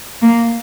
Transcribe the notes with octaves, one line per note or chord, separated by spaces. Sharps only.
A#3